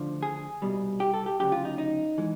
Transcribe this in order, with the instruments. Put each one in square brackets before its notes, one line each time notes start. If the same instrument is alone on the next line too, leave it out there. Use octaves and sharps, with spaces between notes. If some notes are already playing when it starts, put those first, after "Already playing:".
Already playing: [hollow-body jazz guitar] D2 D3 F3
G#4
C2 B2 G3
G4
A4
G4
D2 C#3 F#3 G4
F4
D#4
D#4
E3 G#3